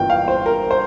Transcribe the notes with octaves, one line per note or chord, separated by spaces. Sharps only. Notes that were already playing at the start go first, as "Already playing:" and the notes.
Already playing: G1 G2 E3 A#3 F4 G5
F5
C5
A#4
C5